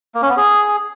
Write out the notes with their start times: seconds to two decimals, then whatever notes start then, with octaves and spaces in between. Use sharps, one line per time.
0.15 A#3
0.22 C#4
0.29 B3
0.37 G#4